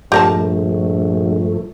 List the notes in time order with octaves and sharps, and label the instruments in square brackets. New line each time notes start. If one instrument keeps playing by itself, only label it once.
[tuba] A#1 [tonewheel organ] G2 F3 A3 [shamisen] G4 A#4 A5